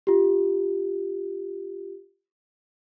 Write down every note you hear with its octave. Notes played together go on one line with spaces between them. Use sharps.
F4 G4